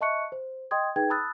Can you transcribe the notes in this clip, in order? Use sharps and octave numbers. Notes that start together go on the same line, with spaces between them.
D#5 E5 A5 C#6 F#6 C#7
C5
D#5 G5 C6 D#6 G#6
D#4 G#4 B4 G5 G#6
A5 B5 D#6 E6 F#6 A6